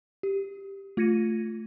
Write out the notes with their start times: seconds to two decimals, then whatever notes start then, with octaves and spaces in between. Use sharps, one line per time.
0.23 G4
0.97 A3 F4 G#6 A#6 C#7 D#7